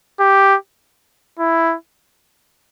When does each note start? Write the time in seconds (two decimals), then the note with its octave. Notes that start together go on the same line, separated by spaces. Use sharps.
0.20 G4
1.39 E4